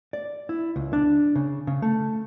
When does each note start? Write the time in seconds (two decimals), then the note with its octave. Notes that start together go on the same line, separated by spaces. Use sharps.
0.13 D5
0.49 E4
0.76 C#2
0.93 D4
1.35 C#3
1.67 C#3
1.82 A3